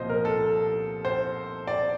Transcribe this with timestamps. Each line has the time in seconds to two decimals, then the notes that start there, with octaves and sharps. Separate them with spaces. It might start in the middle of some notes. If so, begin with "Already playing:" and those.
Already playing: C2 A#2 F3 C5 D#5
0.09 A#4
0.25 A4
1.05 C5
1.68 D5